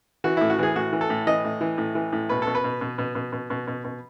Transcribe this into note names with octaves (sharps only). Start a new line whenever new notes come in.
E3 F#4
A2 E4
F#4
E3 G#4
A2 F#4
E3
A4
A2
E3 D#5
A2
E3
A2
E3
A2
B2 B4
B2 A4
B4
B2
B2
B2
B2
B2
B2
B2
B2